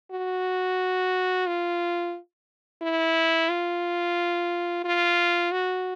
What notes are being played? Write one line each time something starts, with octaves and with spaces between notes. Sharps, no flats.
F#4
F4
E4
F4
F4
F#4